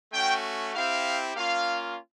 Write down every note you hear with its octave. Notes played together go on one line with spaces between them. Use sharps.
A3 C#4 F#4 G5
C4 E4 G4 F5
A#3 C#4 F4 F5